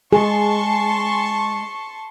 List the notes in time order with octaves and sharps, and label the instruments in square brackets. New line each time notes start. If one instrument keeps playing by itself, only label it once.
[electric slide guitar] G#3 [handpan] G#4 [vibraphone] G#5 [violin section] A5 C6 C#6